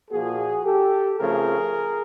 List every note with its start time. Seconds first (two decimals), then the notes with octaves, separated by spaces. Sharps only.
0.11 A#2 F3 A#3 F#4 G#4
0.65 G4 A4
1.18 C#3 F3 A3 C4 G#4 A#4